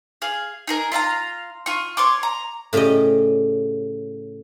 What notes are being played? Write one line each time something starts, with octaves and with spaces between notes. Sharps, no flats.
G#4 F5
D#4 G#4 A#4
F4 E5 F5 A#5
F4 C#6
C#5 C6 D6
A#5
A2 C#3 G4 D5 D#5